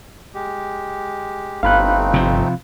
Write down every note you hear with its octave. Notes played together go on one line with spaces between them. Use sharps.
G#3 G4
G1 A3 C4 D#4 F5 B5 F#6
C3 F3